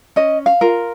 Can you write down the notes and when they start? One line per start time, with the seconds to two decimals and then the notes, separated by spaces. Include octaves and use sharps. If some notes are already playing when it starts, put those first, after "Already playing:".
0.16 C#4 D#5
0.46 F5
0.61 F4 A#4